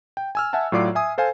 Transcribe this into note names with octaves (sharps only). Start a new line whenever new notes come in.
G5
G#5 E6 F6
E5 F#5 G#5 A5
A2 F#3 F4 D5 D6 C7
E5 G#5 D#6
A4 C5 F5 G#5